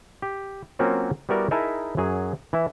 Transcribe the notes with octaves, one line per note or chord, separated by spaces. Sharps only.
G4
F#3 A#3 C4 C#4 F4 F#4
G3 B3 E4 F#4 A#4 D5
D#4 E4 G#4 A#4 E5 A5
F#2 F#3 G#4
E3 E4